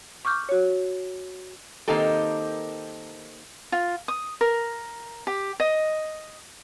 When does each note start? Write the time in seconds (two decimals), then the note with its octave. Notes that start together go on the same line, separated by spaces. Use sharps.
0.25 C#6 D6 F6 G6
0.49 F#4 C#5
1.88 D#3 A#3 C4 D#4 G4 A4
3.72 F4
4.08 D#6
4.41 A#4
5.27 G4
5.60 D#5